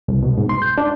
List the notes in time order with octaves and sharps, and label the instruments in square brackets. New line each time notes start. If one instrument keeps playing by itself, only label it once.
[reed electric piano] C2
B2
G#2
C6
G6
D4